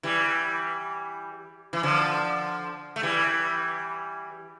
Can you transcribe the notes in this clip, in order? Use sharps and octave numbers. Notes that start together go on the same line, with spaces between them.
E3 G3
E3
D3 F3
A3
E3 G3